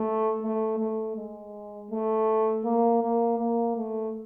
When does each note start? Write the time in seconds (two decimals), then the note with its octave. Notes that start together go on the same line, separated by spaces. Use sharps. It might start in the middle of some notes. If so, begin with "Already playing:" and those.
Already playing: A3
0.43 A3
0.79 A3
1.17 G#3
1.91 A3
2.65 A#3
3.02 A#3
3.39 A#3
3.77 A3